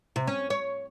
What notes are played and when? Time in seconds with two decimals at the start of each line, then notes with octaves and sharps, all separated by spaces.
0.16 C3
0.27 C#4
0.50 C#5